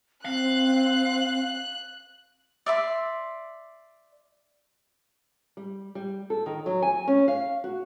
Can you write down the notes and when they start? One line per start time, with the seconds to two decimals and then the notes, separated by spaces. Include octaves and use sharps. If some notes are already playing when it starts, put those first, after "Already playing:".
0.25 C4 F5 F#6
2.66 D5 E5 C6
5.57 G3
5.95 G3
6.30 A4
6.46 D#3
6.66 F#3
6.82 G#5
7.07 C#4
7.28 F5
7.64 F#4